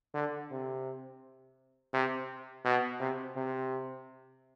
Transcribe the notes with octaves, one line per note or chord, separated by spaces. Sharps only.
D3
C3
C3
B2
C3
C3